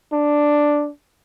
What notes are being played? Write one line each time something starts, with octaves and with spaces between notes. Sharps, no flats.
D4